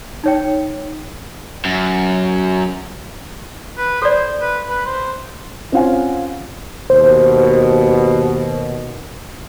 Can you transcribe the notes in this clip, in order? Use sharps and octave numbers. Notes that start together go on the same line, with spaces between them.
D#4 C#5 G5
F#2
B4
A4 C5 D5
B4
B4
C5
C4 C#4 F4 F5 F#5 G#5
D#2 B2 C5